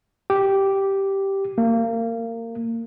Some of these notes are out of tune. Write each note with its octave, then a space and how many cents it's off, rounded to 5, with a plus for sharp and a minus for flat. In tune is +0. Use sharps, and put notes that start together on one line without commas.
G4 -5
A#3 -25